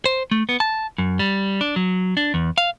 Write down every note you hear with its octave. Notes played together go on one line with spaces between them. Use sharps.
C5
A3
B3
A5
F#2
G3
D4
F#3
D4
E2
F5